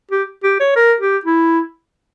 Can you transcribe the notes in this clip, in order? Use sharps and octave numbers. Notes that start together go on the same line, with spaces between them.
G4
G4
C#5
A#4
G4
E4